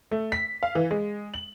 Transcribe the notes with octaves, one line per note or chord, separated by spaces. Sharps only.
A3
B6
F5
E3
G#3
F#7